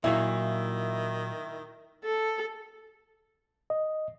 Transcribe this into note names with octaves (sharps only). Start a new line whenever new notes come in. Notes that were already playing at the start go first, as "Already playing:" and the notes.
A#2 D#3 F#3 A#3 E4
A4
D#5